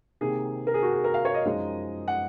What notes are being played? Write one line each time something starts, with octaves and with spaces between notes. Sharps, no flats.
C3 D#3 A#3 G#4
A#4
G#4
F#4
G#4
A#4
F5
C#5
D#5
F#2 F3 G#3 D#4
F#5